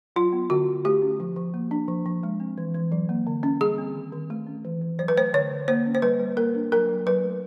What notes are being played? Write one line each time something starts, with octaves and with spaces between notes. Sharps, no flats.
F#3 F4
B3
D3 F#4
D3
A3 G4
C#4
F3
F3
A#3
D4
F3
F3
G#3
C4
E3
E3
F#3
A#3
D3
C#4
G3 G#4
C4
D#3
D#3
A3
C#4
E3
E3
F#3 C5
B4
A3 C5
D3 C#5
D3
A#3 C5
C#4
C5
G3 B4
G3
A#3 A#4
D4
F#3 A#4
F#3
F#3 B4
A3